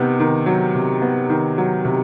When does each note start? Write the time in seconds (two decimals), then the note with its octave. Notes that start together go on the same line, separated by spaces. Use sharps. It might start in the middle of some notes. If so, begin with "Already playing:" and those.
Already playing: C3 D#3 B3
0.20 D#3
0.46 F#3
0.75 C3
1.02 B3
1.30 D#3
1.58 F#3
1.85 C3